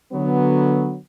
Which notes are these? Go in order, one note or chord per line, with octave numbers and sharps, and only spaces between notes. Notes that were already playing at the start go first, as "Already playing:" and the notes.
D3 F#3 B3